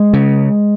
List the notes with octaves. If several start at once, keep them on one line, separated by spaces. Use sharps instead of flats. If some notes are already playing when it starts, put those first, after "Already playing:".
Already playing: G#3
C#3